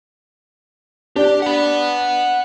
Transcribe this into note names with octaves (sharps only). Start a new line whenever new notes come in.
D4 G4
F#5 B5